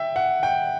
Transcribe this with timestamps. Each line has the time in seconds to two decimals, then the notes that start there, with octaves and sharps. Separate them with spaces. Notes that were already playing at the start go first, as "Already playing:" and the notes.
Already playing: E5 G5
0.16 F#5
0.43 G5